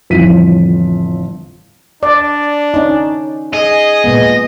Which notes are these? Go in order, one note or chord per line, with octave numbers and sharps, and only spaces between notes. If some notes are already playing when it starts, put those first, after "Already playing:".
G1 F2 A2 E3 B6 D#7
D4 D5
C#4 D#4
G#4 D#5
A#2 G#3 B3